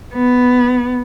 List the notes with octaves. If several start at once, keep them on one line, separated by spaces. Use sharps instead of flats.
B3